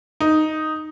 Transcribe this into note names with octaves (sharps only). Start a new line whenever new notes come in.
D#4